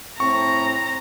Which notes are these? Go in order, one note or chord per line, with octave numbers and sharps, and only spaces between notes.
A2 C4 A#5 C#6